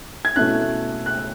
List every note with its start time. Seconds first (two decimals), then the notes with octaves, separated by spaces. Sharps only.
0.25 G#6
0.36 B2 A3 C#4 E4 F#6
1.06 F#6